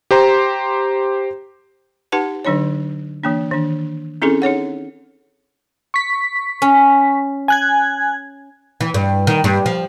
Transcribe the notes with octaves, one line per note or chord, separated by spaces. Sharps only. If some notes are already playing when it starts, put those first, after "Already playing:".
G4 C5 A#5 C6
D#4 G4 B4 F#5 A5
D3 F#3 D4 D#4 C#5
E3 A#3 D4
D#3 D4
C4 C#4 D#4 E4 G#4 A4
D#4 G#4 C#5 F#5
C#6 B6
C#4
G#5 F#6 G#6
E3
G2
D#3
G2
F3